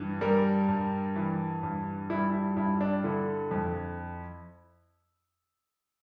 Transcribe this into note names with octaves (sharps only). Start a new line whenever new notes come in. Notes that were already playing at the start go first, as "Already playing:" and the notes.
Already playing: G2 E3
G3 A#4
G2
E3
G2
G3 E4
E4
G2 E4
D4
D3 E4
F2